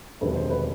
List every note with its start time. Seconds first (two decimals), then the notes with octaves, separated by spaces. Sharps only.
0.21 E1 D2 C3 D#3 F#3 B4
0.36 C5
0.50 B4